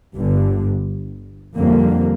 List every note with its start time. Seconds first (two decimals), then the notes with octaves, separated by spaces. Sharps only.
0.16 G1 G2 D3
1.54 F2 D3 G3 A#3